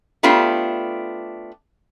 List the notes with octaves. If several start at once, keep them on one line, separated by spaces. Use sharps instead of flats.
A3 B3 D4 F4 G4